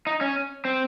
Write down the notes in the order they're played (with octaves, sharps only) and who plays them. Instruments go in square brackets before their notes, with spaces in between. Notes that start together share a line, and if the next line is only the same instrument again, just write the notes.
[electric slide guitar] D#4
C#4
C4